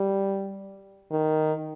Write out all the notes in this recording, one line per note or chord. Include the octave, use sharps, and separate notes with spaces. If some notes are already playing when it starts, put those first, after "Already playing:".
Already playing: G3
D#3